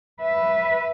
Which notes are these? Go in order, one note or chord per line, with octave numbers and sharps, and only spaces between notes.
B4 E5